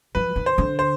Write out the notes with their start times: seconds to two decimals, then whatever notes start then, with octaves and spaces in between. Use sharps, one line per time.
0.15 F3 B4
0.36 D#3
0.46 C5
0.58 D3
0.79 C5